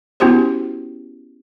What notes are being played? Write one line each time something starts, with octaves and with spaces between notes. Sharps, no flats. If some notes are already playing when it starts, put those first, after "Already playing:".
B3 C#4 E4 F#4 G4 C5